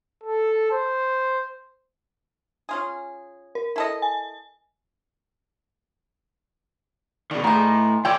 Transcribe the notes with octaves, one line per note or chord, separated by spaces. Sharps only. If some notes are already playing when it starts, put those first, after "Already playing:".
A4
C5
C#4 F4 G#4
A#4
E4 A4 D#5
G#5
B2 D#3 D4 G#4 D5
A2 B3 D#4 G#5 A#5 C6
D#2 A4 C#5 D5 G5